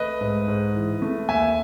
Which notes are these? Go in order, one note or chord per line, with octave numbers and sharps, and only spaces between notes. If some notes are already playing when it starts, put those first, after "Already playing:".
Already playing: A3 B4 D#5
G#2
G#2
E3
A3
D#2 E5 G#5